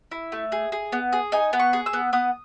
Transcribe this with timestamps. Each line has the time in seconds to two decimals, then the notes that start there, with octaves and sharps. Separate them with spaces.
0.11 E4
0.32 A3
0.52 G#4
0.72 G#4
0.92 B3
1.13 G#4
1.32 D#4 G#5
1.53 B3
1.59 C#6
1.73 G#4
1.86 E6
1.93 B3
2.13 B3 D#6